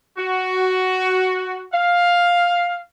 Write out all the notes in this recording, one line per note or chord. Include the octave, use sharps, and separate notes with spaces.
F#4
F5